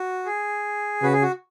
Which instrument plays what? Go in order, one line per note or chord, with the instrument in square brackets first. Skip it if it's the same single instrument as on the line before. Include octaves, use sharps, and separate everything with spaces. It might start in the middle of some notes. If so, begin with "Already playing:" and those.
Already playing: [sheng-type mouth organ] F#4
G#4
[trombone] C#3 [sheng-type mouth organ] F#4 B4
[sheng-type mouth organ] G#4
F#4